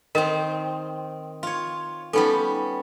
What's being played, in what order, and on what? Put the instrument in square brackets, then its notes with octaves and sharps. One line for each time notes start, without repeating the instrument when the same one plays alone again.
[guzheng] D#3 C4 [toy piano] A#4 D#5
[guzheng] F4 C#5
[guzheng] G3 B3 C#4 [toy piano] D#4 A4